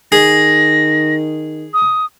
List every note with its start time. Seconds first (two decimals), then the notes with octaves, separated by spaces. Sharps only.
0.12 D#3 G#4 A#6
1.74 D#6